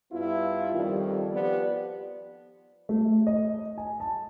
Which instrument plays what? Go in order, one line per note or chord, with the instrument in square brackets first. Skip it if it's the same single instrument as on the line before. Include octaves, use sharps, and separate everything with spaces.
[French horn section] G2 B3 E4 F4
F2 D#3 G3
F3 B3 G4 D5
[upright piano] A3
D#5
G#5
A5